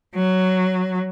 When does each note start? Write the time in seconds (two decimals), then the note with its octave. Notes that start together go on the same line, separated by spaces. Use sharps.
0.15 F#3